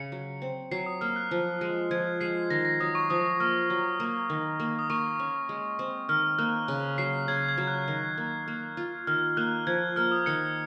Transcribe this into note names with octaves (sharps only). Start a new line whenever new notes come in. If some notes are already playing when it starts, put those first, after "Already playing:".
Already playing: C#3 C#7
F#3
C4
F#3 C7
D#6
A#3 F6
F#6
F3
G#3
F3 G#6
G#3 C7
D#3 A#6
A#6
F#3 D#6
C#6
F3 D#6
A#3 F6
F#3
A#3
D#3
A#3
D#6
A#3 C#6
C#4
G#3
C4
D#3 F6
A#3 F#6
C#3
F#3 C7
C#3 G#6
G#6
F#3
F#6
D#3
A#3
A#3
F4
D#3 F6
A#3 F#6
F3 G#6
A#3 F6
D#6
D#3 C#7